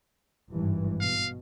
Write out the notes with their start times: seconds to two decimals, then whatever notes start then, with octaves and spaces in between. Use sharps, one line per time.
0.50 G#1 G2 E3
1.01 B2 F5